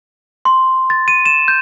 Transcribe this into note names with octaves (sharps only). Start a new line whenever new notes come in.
C6
A6
D#7
E7
G6